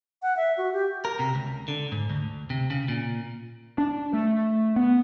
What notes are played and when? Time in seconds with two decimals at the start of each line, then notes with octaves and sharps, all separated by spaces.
0.22 F#5
0.37 E5
0.58 F#4
0.73 G4
1.05 A#4
1.19 C3
1.35 C#2
1.68 D3
1.92 G#2
2.10 D2
2.50 C3
2.70 C#3
2.88 A#2
3.78 D4
4.13 A3
4.76 B3